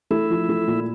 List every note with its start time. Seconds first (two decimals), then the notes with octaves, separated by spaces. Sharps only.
0.11 A3 E4
0.30 F3
0.49 A3
0.67 A#2